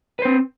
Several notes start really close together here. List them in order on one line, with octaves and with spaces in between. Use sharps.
B4 C5 C4